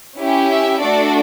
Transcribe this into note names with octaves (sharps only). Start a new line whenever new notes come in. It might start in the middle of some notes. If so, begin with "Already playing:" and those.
C#4 E4 G4
E5
A3 D4 F#4 A4 D5